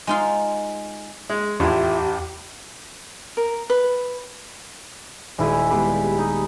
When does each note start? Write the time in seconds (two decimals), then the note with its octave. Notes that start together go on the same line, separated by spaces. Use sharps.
0.07 G#3 D#4 F4
1.29 G#3
1.60 A1 E2 E4 F4 G4
3.37 A#4
3.70 B4
5.38 D#1 G#3 E4 G4 G#5
5.70 G#3 B3 G4 B4 D5
6.19 D#4